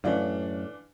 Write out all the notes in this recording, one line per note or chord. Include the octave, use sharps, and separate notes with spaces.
F#2 A2 E3 D4 F4